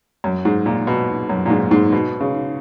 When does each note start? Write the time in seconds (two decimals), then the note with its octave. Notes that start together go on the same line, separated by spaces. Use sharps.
0.24 F#2
0.45 G#2
0.66 A#2
0.87 B2
1.29 F#2
1.46 A#2
1.50 G#2
1.71 G#2
1.92 B2
2.20 C#3